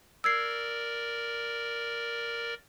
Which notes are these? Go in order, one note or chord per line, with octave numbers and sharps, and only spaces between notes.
A#4 D5 E6 G#6 C7